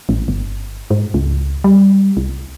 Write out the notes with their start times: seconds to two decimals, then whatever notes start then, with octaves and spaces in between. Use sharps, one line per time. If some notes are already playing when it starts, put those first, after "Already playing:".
0.09 A1
0.28 G1
0.91 G#2
1.14 C#2
1.64 G3
2.17 C2